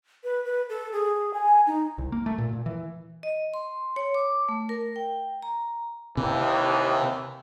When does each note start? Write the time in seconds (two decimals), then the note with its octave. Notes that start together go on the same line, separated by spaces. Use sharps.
0.24 B4
0.45 B4
0.69 A4
0.93 G#4
1.34 G#5
1.67 D#4
1.98 C2
2.12 A#3
2.26 A3
2.38 A#2
2.53 A#2
2.66 E3
3.23 D#5
3.54 C6
3.96 C#5
4.14 D6
4.49 A3
4.69 A#4
4.96 G5
5.43 A#5
6.17 D#2 C3 E3